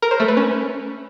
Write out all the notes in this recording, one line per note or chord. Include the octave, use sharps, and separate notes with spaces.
A#4
C5
A3
B4
C#4